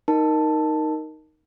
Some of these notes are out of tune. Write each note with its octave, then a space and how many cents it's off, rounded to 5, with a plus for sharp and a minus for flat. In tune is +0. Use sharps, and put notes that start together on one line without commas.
D#4 +0 A#4 +0 A5 +0